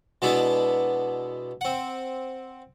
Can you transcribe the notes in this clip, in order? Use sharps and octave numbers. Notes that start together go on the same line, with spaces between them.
B2 G#3 B3 D4 E4
C4 F#5